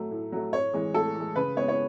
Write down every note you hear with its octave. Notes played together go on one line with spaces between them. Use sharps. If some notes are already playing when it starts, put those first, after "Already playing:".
Already playing: A2 F#3 A3
A2
F#3 A3
A2 C#5
E3 G#3
A2 A4
E3
G#3
C#3 B4
G#3 B3 C#5
C#5